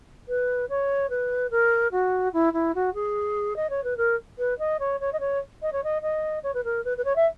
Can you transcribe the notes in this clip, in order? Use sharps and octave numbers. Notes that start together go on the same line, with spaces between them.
B4
C#5
B4
A#4
F#4
E4
E4
F#4
G#4
D#5
C#5
B4
A#4
B4
D#5
C#5
C#5
D#5
C#5
D#5
C#5
D#5
D#5
C#5
B4
A#4
B4
B4
C#5
E5